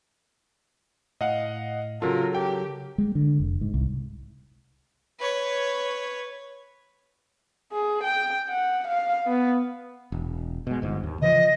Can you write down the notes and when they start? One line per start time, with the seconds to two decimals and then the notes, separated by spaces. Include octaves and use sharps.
1.21 A2 D#5 F5 F#5
2.02 C#3 F#3 F4 A4 A#4
2.35 G4 G5
2.98 G#3
3.15 D3
3.40 F1
3.61 G#2
3.74 C2
5.19 B4 C#5
7.72 G#4
8.04 G5
8.50 F#5
8.87 F5
9.27 B3
10.12 E1
10.67 B2 G#3
10.82 G1 G#2
11.03 D#2
11.22 C#3 E3 F3 D#5